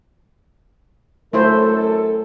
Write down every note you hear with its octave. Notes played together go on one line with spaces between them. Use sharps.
F#2 A3 E4 A4 C5